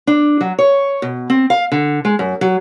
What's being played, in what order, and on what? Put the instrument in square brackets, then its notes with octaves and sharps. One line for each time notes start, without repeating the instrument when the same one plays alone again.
[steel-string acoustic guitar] D4
F#3
C#5
B2
C4
F5
D3
G#3
F#2
F#3